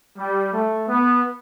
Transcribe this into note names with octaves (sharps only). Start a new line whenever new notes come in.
G3
A3
B3